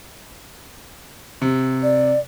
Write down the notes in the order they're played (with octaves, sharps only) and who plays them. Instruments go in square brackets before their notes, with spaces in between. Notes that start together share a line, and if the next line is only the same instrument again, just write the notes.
[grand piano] C3
[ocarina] D5